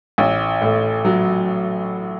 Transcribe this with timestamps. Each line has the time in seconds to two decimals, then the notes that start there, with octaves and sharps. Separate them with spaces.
0.18 A1
0.61 A2
1.05 F#3